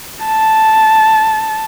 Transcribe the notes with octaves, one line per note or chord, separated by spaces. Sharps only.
A5